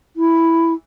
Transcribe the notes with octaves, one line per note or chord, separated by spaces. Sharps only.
E4